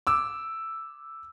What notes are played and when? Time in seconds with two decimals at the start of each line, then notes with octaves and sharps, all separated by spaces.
0.07 D6 E6